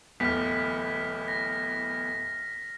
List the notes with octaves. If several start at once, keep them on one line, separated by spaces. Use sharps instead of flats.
D1 E2 F6 B6
A#6